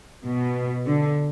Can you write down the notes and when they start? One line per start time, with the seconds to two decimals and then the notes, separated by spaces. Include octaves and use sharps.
0.24 B2
0.85 D3